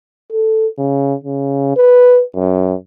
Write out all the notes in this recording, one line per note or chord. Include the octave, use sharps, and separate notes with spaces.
A4
C#3
C#3
B4
F#2